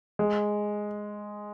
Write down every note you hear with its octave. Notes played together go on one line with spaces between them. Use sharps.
G#3